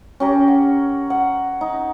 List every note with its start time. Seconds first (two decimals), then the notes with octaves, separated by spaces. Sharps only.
0.20 C#4 G4 A#4
0.48 F#5
1.10 F#5
1.61 D#4